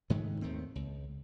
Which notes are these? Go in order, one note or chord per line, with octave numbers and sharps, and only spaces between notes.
G#2 D#3 G#3 A3
D#2 D#3 A3 C4
C#2